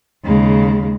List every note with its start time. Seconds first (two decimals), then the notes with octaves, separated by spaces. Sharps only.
0.25 D#2 C#3 G#3